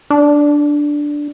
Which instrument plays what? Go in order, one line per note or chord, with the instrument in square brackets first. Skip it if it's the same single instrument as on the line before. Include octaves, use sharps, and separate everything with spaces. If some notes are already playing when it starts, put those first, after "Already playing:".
[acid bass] D4